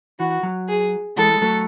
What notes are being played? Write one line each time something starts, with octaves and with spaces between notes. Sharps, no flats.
E3 F#4
F#3
G#4
E3 G#3 A4
G#3
F#3 A3